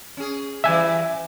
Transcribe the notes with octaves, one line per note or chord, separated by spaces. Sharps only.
C#4 G#4
E3 G3 E5 G#5